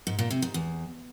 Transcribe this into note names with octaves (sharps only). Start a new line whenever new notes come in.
G#2
A#2
C3
G#2
E2